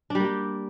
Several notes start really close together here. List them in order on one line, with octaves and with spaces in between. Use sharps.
D4 G3 A#3 G4